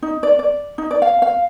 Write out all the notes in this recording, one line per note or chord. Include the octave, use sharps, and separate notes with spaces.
D#4
D5
D5
D#4
D5
F5
F5